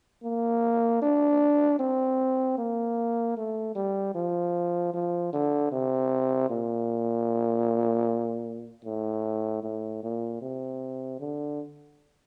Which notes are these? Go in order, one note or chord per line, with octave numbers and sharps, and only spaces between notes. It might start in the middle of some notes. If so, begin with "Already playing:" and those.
A#3
D4
C4
A#3
A3
G3
F3
F3
D3
C3
A#2
A2
A2
A#2
C3
D3